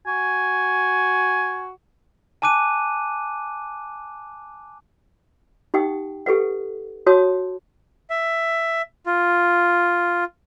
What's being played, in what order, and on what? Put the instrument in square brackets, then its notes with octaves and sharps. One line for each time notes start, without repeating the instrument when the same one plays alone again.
[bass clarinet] F#4 [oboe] G#5
[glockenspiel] G#5 A5 D6 F#6 D#7
[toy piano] D#4 G4 F#5 G5 D#6
G4 A4 B4 F#5
F#4 C#5 A5 D#6
[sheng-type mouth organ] E5
F4